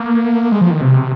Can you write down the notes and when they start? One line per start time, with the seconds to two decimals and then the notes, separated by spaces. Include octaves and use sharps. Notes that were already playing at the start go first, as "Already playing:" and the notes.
Already playing: A#3
0.52 G#3
0.61 F3
0.71 D#3
0.81 C3